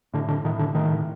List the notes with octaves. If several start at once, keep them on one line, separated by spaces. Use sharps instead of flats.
A2 D3
D3
A2 D#3
D3
A2 D#3